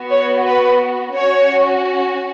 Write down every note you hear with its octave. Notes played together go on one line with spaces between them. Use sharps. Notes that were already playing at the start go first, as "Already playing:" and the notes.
Already playing: B3 F#4
C#5
B4
C#4 F#4 C#5